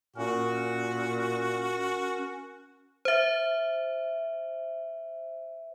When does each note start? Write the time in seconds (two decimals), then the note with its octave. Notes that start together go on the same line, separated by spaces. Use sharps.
0.16 A#2 C#4 F#4 A#4
3.05 C5 E5